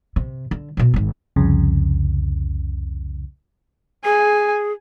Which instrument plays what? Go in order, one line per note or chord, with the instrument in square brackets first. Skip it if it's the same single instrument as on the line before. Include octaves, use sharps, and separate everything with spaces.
[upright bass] C3
D3
B2 F3
G#1 D#3
[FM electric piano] C2 F2 C#3
[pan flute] G#4 [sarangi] G#5